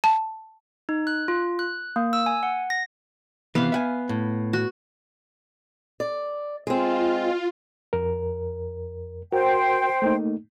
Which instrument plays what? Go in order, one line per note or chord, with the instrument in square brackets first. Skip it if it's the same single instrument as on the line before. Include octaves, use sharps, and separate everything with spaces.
[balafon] A5
[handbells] D#4
F#6
F4
F#6
A#3
E6
G#5
F#5
A#6
[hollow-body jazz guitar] C3 E3 [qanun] B3 F5
[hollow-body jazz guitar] E5 F#5 G#5
A2
[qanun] F#4
[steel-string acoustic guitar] D5
[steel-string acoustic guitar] G#3 C4 [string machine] F4
[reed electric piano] F2 A#4
[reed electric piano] F#4 A#4 [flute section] C5 G5
[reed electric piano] A3 A#3 D#4